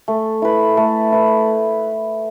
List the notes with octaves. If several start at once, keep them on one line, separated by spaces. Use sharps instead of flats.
A3
E4 B4
A3
E4 B4